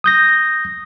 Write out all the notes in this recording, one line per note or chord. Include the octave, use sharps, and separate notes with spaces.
D#6 G6 A#6